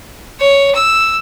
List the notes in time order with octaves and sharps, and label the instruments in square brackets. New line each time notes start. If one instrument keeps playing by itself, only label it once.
[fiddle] C#5
E6